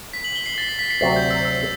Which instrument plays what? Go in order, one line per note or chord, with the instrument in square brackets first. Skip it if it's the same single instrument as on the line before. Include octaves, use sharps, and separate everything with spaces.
[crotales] B6
F#7
G7
C7
A6
B6
B6
C7
[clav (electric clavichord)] D2 C3 F#3 C4 [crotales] A6
[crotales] G6
E6
E6